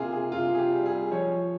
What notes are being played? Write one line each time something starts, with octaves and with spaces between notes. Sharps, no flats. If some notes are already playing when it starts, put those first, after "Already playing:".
Already playing: C3 A#3 F4 G#4
G#4
C3 F4
G#4
G4
G3
G#4
F3 C#5